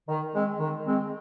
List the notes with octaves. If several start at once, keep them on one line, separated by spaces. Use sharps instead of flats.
D#3
G#3 C4
D#3
G#3 C4